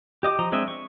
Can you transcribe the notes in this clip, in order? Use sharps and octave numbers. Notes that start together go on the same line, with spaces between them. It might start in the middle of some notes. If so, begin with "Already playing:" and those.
G4 D#5 D6
F3 D#5 A#5
G#3 C4 D4 D#5 E5
C#6